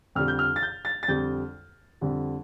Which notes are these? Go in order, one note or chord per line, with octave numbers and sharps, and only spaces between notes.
F2 D3 G3 F6
G6
F6
A6
G6
A6
A6
F2 D3 G3 G6
F2 D3 G3